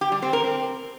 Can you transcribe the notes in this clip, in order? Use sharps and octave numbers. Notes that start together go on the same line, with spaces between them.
G4
G3
C4
A#4
C4